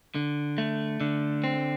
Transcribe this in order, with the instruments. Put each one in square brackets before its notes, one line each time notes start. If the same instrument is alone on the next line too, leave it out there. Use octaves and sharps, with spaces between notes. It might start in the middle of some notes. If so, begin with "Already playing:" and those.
[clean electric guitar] D3
A3
D3
C4